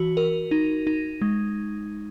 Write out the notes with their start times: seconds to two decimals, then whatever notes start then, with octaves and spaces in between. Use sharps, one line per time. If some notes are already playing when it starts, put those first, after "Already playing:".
Already playing: E3 F#4
0.17 A#4
0.51 D#4
0.87 D#4
1.22 G#3